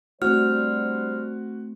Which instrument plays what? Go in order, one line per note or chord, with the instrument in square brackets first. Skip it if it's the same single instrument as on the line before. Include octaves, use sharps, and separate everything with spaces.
[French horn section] G3 D4 C5 [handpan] A3 C4 [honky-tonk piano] F#4 [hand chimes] F6